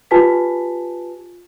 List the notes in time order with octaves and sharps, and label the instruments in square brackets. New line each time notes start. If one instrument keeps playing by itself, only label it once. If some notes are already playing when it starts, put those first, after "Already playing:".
[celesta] F4 G4 B4 G#5 A5 B6